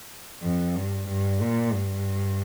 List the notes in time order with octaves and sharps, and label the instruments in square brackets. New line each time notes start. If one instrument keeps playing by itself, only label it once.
[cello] F2
G2
G2
A#2
G2